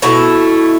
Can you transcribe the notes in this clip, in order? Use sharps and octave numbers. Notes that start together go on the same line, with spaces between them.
B2 A3 E4